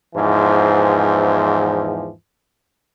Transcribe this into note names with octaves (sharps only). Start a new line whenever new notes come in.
E2 G#2 E3 F3